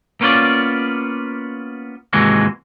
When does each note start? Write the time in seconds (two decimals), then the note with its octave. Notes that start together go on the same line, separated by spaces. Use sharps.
0.21 A#3 B3 C#4 D#4 F4 D5
2.13 D#2 G#2 C3 E3 G#3 F#4